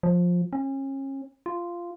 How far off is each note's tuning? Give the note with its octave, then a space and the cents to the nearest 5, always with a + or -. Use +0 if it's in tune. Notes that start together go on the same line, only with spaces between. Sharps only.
F3 +15
C#4 -35
F4 -10